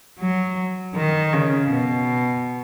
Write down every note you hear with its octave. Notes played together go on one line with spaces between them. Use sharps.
F#3
D#3
C#3
B2